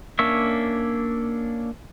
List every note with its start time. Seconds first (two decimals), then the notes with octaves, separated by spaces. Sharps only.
0.19 A#3 C#4 D4 C#5 E5